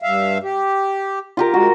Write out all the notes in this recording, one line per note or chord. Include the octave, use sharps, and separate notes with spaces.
G2 E5 F5
G4
F4 G4 A#4
G#3 F#4